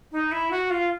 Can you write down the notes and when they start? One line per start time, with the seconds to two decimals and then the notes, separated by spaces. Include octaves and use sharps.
0.12 D#4
0.31 E4
0.51 F#4
0.70 F4